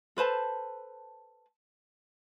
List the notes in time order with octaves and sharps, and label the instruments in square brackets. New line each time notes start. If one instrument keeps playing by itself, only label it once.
[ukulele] A4 B4 C5 A5